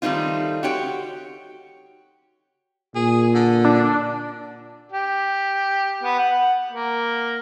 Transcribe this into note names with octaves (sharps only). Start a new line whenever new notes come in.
D#3 G3 A3 C4 D#4 F4
F#4 G4 C#5 G5
A#2 G#4
D3
D4
G4
B3
F#5
A#3